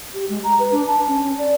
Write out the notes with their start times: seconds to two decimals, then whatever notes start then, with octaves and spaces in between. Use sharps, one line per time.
0.14 G4
0.29 G#3
0.44 A#5
0.59 B4
0.72 D4
0.87 A5
1.08 C#4
1.24 C#4
1.38 D5